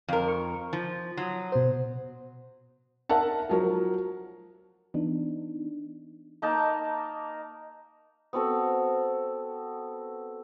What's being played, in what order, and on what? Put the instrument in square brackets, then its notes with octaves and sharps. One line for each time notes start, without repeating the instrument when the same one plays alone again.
[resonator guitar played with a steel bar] F2 A#4
[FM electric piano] C#6
[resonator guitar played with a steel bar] F3
[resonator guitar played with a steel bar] F#3 [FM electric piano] C6 D#6
[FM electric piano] B2 C5
[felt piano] A#4 E5 F#5 A5
F3 F#3 A#4
[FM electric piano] E3 B3 D4 D#4
[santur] A#3 D#4 A#4 A5
B3 C4 F#4 A4